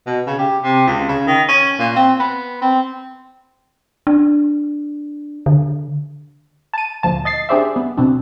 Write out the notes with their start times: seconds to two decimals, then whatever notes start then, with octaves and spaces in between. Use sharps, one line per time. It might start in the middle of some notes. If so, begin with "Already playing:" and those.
0.06 B2
0.27 C#3
0.39 G4
0.63 C3
0.87 C#2
1.08 C#3
1.27 D#3
1.49 C#4
1.79 A#2
1.96 C4
2.20 B3
2.62 C4
4.07 D4
5.46 D3
6.74 A5 D#7
7.03 D2 A#2 F3 A5
7.25 D#5 A6 C7
7.49 D4 G4 G#4 C5 D5 E5
7.76 B3
7.97 B2 C4 D4